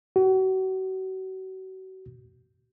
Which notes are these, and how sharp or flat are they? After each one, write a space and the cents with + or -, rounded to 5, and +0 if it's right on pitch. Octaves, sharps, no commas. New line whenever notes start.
F#4 +35